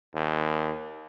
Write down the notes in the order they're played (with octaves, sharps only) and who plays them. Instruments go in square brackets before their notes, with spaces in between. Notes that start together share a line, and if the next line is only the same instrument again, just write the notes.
[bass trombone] D#2